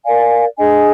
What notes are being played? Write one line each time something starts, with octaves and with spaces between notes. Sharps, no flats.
A#4 D5 F5 G#5
D4 G#4 D#5 G#5